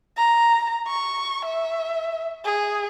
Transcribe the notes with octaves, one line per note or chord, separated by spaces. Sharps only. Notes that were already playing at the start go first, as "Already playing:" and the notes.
A#5
C#6
E5
G#4